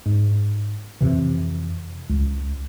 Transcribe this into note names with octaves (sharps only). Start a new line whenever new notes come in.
G#2
F2 C3 E3
C#2